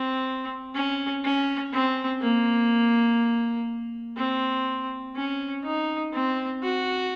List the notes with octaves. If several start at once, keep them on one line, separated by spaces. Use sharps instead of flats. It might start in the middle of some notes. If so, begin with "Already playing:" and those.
Already playing: C4
C#4
C#4
C4
A#3
C4
C#4
D#4
C4
F#4